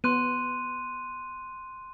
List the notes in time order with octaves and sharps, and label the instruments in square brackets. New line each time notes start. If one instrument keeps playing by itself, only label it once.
[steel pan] B3 [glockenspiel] C6 F#6 D#7